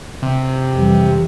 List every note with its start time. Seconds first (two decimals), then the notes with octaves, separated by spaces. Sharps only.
0.22 C3
0.71 F2 E3 G3